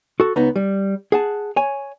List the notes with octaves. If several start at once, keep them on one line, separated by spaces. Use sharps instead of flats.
F#4 A4
C#2 B3 D#4 A#5
G3
G#4 F#5 A5
C#5 G#5